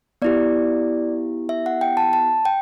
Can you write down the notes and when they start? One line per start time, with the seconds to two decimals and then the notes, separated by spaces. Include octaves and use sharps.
0.22 B3 E4 G4 D5
1.49 E5
1.66 F#5
1.81 G5
1.97 A5
2.13 A5
2.45 G5